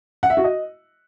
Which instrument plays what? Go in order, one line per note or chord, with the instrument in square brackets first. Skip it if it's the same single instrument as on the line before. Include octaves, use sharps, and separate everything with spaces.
[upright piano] F#5
E5
F#4
D#5